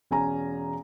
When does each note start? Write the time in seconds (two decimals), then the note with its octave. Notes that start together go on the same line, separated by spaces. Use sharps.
0.11 E1 C#4 G#5 A#5